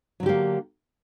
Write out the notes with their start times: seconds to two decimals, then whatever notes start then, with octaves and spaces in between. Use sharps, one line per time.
0.20 F#3
0.23 D3
0.26 G4
0.29 A#3